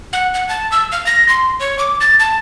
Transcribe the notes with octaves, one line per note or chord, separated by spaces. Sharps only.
F#5
F#5
A5
E6
F5
A#6
C6
C#5
D6
A6
A5